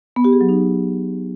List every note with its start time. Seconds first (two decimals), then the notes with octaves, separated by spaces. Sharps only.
0.16 B3
0.24 G4
0.33 G#4
0.41 F#3
0.49 D#4